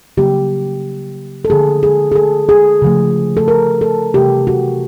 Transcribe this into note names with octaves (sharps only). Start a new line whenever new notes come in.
C#3 F#3 A#3 G4
A4
D3 F3 A#3 G#4
G#4
G#4
A4
G#4
C#3 F3 A3
A4
A#4
A4
C3 E3 A3 G4
F#4